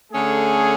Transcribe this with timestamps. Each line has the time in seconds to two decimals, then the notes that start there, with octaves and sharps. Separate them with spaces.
0.12 D3 A3 C#4 G#4